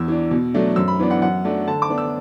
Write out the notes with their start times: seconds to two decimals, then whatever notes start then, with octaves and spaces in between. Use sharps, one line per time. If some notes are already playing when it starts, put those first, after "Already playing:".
Already playing: E2 E6
0.08 E3 D4
0.31 B2
0.54 F#3 A3 D4
0.76 F#2 E6
0.88 B5
0.99 E3 B3 D4
1.11 F#5
1.22 F#2 F#5
1.44 F#3 A3 D4
1.67 D3 A5
1.82 D6
1.90 B3 D4
1.98 E6